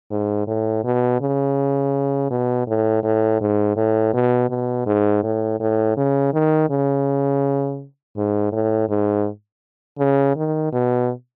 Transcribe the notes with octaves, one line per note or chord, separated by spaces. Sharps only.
G#2
A2
B2
C#3
B2
A2
A2
G#2
A2
B2
B2
G#2
A2
A2
C#3
D#3
C#3
G#2
A2
G#2
C#3
D#3
B2